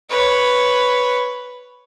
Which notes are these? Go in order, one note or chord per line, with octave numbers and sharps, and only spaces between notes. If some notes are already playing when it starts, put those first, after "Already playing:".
B4 C#5